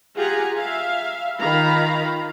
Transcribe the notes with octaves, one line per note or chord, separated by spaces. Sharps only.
F4 G4 G#4 F#5 G#5 A#5
E5 F5
D#3 F4 F5 A#5 B5